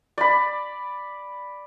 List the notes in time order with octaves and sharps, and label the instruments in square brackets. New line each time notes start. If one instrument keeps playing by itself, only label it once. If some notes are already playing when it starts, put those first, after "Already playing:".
[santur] D5 B5